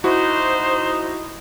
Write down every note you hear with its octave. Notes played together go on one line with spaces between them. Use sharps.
D#4 E4 F#4 C5